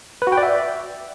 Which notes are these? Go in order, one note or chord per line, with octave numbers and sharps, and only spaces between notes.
B4
F#4
G5
D5
E5